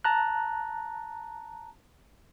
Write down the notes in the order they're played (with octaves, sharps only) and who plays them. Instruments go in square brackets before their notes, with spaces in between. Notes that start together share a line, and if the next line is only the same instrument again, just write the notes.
[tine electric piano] A5 A#5 F#6